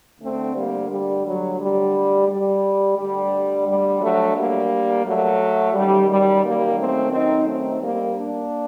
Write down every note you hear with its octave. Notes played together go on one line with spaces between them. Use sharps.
D2 D3 A3 C4
G3 A#3
G3
F#3
G3
G3
D2 D3 G3
G3
F#3 A3
G3 A#3
F#3 A3
F#2 D#3 G3
G3
G3 A#3
A3 C4
C4 D#4
A3 C4
G3 A#3
A#3 D4